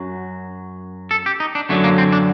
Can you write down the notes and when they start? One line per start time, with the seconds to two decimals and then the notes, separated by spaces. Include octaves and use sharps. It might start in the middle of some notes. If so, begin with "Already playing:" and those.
Already playing: F#2 F#3
1.11 A4
1.26 G4
1.40 D#4
1.55 D4
1.69 F#2 D3 F#3 A3
1.84 A#3
1.98 C4
2.12 D4